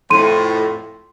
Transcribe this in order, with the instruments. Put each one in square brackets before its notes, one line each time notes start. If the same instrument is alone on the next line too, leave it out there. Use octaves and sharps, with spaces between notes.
[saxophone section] F2 A2 [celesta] C6 D#7